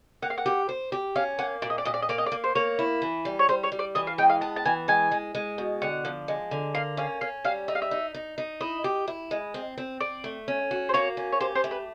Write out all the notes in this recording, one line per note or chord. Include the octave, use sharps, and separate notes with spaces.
A#3 F#5
F5
F#5
G4
C5
G4
C#4 F5
A#3 F#5
A#2 D5
D#5
D5
A#2 D#5
D5
D#5
A#3 D5
D#5
D5
A#3
C5
A#3 C#5
E4
E3
G3
C#5
G3 C5
C#5
G3
D5
E3 D#5
F5
G#3 G5
F5
B3 A5
A5
E3 G#5
G#3 G#5
G#3
G#3
B2
D3 F#5
F3
G#3
D3
A#3 F5
C#4 F5
C#4 F5
G3 F5
D#4 E5
F5
E5
D#4
D#4
D#4
E4 D#5
G4
E4
G#3
C4
C4
C4 D5
A3
C#4
F#4
C5
A#3 C#5
C#4
C#5
G4 C5
C5
A3
B4